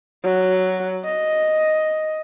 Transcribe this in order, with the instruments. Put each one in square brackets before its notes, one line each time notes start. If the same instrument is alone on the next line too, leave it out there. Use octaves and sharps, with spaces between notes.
[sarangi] F#3
D#5